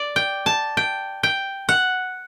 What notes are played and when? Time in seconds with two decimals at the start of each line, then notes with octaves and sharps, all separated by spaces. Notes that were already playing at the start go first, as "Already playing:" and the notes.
Already playing: D5
0.16 G5
0.46 A5
0.77 G5
1.23 G5
1.69 F#5